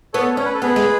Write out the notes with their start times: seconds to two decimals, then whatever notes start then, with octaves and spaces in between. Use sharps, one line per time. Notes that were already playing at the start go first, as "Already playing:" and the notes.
0.14 B3 A4 C#5
0.37 C#4 C#5
0.46 B4
0.54 A4
0.62 B3 G#4 B4
0.76 G#3